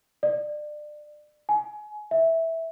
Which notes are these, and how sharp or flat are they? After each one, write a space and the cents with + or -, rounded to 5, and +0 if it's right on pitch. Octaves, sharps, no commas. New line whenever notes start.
D5 +25
G#5 +25
E5 -10